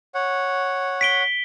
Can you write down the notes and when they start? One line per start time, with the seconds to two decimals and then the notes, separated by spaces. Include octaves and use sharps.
0.15 C#5 F#5
1.01 B6 D7 G7